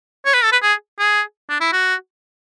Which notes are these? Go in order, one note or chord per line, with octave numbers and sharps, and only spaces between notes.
C#5
B4
A4
B4
G#4
G#4
D4
E4
F#4